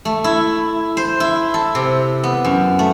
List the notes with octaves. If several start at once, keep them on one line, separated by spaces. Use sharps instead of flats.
A3
E4
C5
E4
A4
C3
B3
F#2
A3